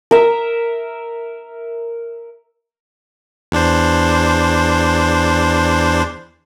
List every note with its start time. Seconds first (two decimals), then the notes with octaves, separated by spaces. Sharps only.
0.11 A#4 E5
3.52 E2 D4 C5